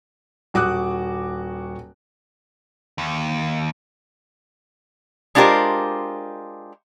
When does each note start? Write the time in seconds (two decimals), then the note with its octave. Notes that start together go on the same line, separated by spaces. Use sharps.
0.54 D#1 F#4 D6 D#6 F#6
2.98 D#2
5.35 G#3 D4 F4 G4 A#4 C5